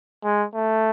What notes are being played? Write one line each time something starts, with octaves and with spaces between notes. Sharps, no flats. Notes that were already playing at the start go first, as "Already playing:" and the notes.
G#3
A3